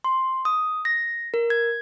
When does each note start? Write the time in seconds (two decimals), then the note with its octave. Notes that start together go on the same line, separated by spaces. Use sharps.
0.04 C6
0.45 D#6
0.85 A#6
1.34 A#4
1.50 G#6